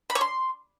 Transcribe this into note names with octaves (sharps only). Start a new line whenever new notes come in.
B5
C#5
C6